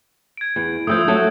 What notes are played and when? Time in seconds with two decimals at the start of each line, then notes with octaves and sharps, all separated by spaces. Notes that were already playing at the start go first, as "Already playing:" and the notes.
0.37 G#6 D7
0.56 E2
0.87 F3 G3 A3 D#6 E6 G6
1.08 F#3 A3 A4